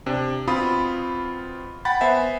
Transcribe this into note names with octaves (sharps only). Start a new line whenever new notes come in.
C3 D4
B2 C4 F4 B5 D#6
F#5 G5 B5 A6
B3 C5 E5 G#5